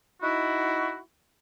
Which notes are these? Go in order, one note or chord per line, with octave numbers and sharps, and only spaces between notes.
D#4 E4 F#4